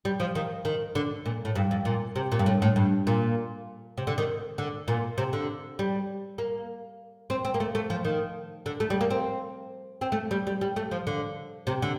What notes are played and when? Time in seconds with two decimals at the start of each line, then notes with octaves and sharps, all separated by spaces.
0.05 G3
0.20 F3
0.35 D#3
0.65 D#3
0.95 D3
1.26 A#2
1.45 A2
1.56 G2
1.71 F2
1.85 A#2
2.16 C3
2.32 A#2
2.39 G2
2.46 A2
2.62 A2
2.76 G2
3.07 A#2
3.98 C3
4.07 D3
4.18 D#3
4.58 D3
4.88 A#2
5.18 C3
5.33 D3
5.79 G3
6.38 A#3
7.30 C4
7.45 C4
7.54 A#3
7.60 A3
7.75 A3
7.90 F3
8.05 D#3
8.66 D3
8.80 A3
8.90 G3
9.01 A#3
9.10 C4
10.01 C4
10.12 A3
10.31 G3
10.47 G3
10.61 G3
10.76 A3
10.91 F3
11.07 D3
11.67 C3
11.82 D3